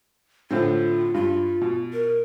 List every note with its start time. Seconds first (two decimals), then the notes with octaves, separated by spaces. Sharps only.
0.51 A2 D3 C4 F4
1.14 G2 F4
1.61 B2
1.93 A#4